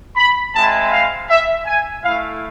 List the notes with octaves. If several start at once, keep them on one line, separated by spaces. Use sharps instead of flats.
B5
G#3 C4 E4 A5
F5
E5
G#5
A3 E4 F5